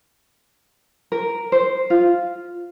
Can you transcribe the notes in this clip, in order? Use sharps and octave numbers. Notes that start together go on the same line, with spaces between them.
A#4
C5
F4